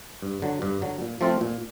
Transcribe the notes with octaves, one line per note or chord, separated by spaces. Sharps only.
G2
D3 F#3
G2
D3 F#3
A#2
F3 A3 C4 F4
A#2